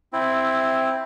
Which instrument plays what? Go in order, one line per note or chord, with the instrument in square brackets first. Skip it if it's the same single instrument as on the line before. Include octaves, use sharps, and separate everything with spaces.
[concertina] C4 E4